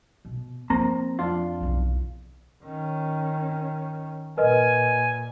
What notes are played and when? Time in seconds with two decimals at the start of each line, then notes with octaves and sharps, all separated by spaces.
0.25 B2
0.70 F3 A#3 C4 A#5
1.19 F2 D4 F4
1.60 B1 E2
2.63 D#3 C#4
4.37 A#2 A#4 B4 D#5 G#5